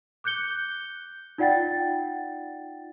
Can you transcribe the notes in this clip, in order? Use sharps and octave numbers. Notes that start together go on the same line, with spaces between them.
D6 F#6 G6 C#7 G7
D#4 F4 D5 F#5 G5 A6